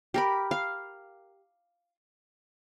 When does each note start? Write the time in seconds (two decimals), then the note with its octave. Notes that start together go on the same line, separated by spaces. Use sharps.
0.14 G4 A#4 B5
0.51 F5